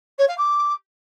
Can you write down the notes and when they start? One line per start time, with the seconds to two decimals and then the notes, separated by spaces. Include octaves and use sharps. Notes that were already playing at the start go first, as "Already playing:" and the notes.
0.18 C#5
0.28 F5
0.37 D6